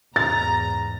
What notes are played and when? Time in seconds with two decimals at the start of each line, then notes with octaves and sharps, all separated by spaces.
0.16 E2 G#2 A#5 A6